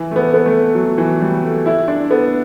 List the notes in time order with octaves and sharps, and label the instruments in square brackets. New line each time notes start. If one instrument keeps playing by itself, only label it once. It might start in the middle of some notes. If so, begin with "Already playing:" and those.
Already playing: [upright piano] E3
A3
B3
B3
A3
F#3
E3
G3
A3
E4
D4
B3